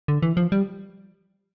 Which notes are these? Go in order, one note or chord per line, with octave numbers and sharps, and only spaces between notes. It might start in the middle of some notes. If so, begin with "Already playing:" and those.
D3
E3
F3
G3